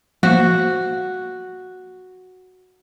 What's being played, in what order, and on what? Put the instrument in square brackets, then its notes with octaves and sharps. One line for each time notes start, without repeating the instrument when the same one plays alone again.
[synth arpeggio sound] F3 A#3 [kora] F#4